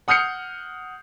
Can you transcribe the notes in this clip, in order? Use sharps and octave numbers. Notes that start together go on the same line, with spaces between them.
F#5 D#6 F6 G6 C7 C#7